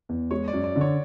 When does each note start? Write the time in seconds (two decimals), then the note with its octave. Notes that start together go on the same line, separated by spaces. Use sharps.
0.09 E2
0.31 G#3 C#5
0.48 D5
0.53 F#2
0.64 D5
0.76 D3
0.81 C#5